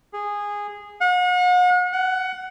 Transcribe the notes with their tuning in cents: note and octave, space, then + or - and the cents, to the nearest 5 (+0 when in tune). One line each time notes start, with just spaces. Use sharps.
G#4 -15
F#5 -40
F#5 +15